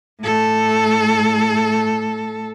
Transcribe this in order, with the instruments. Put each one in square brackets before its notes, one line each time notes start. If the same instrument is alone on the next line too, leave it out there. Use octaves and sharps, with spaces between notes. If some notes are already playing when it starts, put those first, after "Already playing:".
[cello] A2 A4